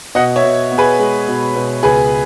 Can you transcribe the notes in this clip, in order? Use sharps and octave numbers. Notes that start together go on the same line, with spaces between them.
B2 D#5 F#5
C#5 E5
B2
B3
G#4 B4
G#3
B2
B2
C#2 G#4 B4